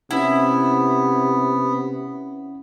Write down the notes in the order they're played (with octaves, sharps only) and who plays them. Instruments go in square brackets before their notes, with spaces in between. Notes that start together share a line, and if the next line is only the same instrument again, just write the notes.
[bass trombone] C3 [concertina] B3 [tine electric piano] C#4 F#5 [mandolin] E4